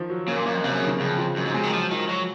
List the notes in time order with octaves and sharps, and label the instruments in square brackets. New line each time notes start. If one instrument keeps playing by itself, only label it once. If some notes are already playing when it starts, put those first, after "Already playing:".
Already playing: [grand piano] D#3 F3
F#3
[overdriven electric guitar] C#3 [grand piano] A#3
[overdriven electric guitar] A#2
[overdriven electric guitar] F#2 [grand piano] A#3
[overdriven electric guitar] F2
[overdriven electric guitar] F#2 [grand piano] C3
[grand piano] C#3
D#3
[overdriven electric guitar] F2 [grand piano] C#3
[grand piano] F3
[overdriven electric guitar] F#2 [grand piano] F#3
[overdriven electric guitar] G#2
[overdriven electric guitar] C3 [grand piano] G#3
[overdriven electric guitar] D#3
[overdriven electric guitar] F3 [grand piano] F#3
[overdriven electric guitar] D#3 [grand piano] F3
[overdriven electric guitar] F#3